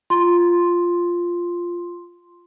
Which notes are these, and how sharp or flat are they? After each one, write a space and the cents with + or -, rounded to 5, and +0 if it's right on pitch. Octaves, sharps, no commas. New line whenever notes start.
F4 +0 C6 +5